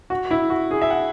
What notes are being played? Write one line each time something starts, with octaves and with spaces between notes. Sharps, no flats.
F#4
E4
F#4
G#4
E5
F#5